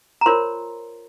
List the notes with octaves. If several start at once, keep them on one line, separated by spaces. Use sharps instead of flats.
A#5
F4 A#4 C5 C#5 C6